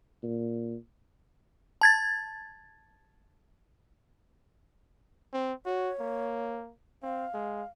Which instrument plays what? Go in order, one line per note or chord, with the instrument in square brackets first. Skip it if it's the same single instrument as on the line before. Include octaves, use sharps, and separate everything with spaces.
[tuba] A#2
[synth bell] A5 G#6 A6
[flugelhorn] C4
[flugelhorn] F#4 [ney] C#5
[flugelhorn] A#3
[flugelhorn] C4 [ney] F5
[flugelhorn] G#3